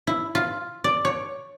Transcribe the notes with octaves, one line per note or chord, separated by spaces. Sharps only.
E4
F4
D5
C#5